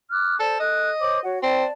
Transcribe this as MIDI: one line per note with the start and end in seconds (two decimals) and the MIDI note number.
0.11 0.36 86
0.11 0.36 89
0.11 0.36 90
0.39 0.55 69
0.39 0.56 72
0.39 0.56 74
0.59 0.90 69
0.59 1.20 75
0.59 0.90 90
1.01 1.19 72
1.01 1.19 73
1.01 1.19 86
1.24 1.40 66
1.24 1.40 73
1.24 1.40 78
1.42 1.64 60
1.42 1.72 74
1.42 1.72 81